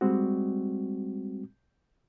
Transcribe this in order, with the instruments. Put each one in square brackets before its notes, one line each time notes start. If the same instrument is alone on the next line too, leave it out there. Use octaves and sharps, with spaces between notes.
[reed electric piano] G3 G#3 C4 F#4